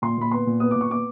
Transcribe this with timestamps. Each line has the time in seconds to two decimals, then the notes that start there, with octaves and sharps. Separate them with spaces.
0.02 A#2 C6
0.17 A#2 B5
0.31 B3 C6
0.47 A#2
0.60 B3 D#6
0.71 A#2 D6
0.81 C#6
0.90 B3 D6